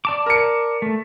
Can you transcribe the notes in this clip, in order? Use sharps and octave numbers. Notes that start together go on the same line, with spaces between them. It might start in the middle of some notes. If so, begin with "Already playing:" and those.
D5 A5 D6
A#4 C#7
A3